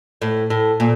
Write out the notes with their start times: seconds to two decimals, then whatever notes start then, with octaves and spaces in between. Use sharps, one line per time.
0.22 A2
0.50 A2
0.80 A#2